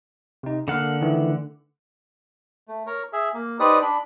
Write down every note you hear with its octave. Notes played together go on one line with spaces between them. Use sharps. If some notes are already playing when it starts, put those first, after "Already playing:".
C3 D#4
D3 A#3 A#4 F5 F#5
D#3 E3 A3
A3
A#4 C#5
G#4 E5
A#3
D#4 G4 B4 C5 D5 D#6
D4 B5